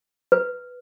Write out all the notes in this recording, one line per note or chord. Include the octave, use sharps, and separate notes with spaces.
B4